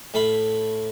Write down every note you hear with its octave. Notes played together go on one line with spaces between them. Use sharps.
A2 A3 F5 B5